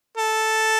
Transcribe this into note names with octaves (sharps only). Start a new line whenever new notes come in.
A4